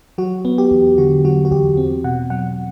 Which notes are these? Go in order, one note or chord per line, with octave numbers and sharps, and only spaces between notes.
F#3 F#4
B3
G4
E2
D3 F#4
F#3 F#4
F#4
E2 G4
C4
B2 F#5
F#3 F#5